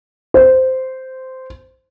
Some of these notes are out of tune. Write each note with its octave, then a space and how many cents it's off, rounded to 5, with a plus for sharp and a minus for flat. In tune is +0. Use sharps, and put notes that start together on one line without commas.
C5 -10